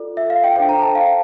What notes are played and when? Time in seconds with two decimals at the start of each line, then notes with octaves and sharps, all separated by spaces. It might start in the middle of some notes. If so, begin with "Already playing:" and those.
Already playing: F4 A4 D5
0.17 E5
0.30 F5
0.44 G5
0.56 D4 A4 C5 G5
0.69 A#5
0.82 A5
0.95 F5